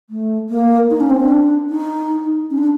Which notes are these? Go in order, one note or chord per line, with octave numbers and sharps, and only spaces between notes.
A3
A#3
D#4
C#4
C4
D4
D#4
C#4
D4